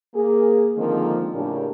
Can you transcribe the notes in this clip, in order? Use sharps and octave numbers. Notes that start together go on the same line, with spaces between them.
A#3 G#4
D3 D#3 F3 G#3 A#3 C4
A2 C#3 A#3 C#4 D4 G4